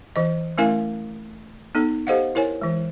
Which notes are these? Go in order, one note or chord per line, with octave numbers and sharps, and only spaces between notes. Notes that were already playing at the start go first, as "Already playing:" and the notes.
E3 D#5
A3 C#4 E4 A#4 F5 G#5
B3 D#4 A4
G4 A4 C5 D#5 F5 F#5
E4 A#4 C#5 G#5
E3 G#3